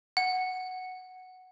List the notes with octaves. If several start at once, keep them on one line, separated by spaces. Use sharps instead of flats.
F#5